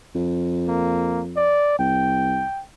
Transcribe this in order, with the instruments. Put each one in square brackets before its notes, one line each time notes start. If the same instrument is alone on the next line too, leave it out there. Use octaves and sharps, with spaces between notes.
[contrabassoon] F2
[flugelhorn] A#3
D5
[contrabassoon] C2 [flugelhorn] G5